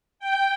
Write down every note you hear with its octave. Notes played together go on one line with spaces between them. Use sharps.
G5